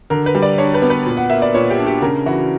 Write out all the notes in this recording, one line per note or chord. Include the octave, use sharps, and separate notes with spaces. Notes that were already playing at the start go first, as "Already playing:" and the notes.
D3 A#4
B4
G3
D5
D4 C#5
B4
B3
B4
A#2
F#5
A#3 E5
D5
A#2 C#5
G4
D4
G4
C#3 A#4
E3 F#4